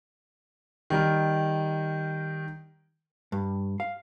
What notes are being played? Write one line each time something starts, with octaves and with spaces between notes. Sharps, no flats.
D#3 G3 D#4 F6
G2
F5